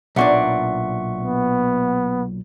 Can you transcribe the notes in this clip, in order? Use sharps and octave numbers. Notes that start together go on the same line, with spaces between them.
B1 A#2 D4 E5 F#5 C#6
B3